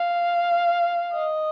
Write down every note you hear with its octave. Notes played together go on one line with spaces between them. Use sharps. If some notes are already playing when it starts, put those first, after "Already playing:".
Already playing: F5
D#5